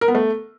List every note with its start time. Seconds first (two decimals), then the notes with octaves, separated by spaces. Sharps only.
0.01 A#4
0.08 B3
0.15 A3